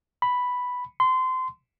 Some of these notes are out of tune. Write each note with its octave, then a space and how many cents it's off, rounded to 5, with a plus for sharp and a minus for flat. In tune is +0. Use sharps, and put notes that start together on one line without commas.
B5 +0
C6 -25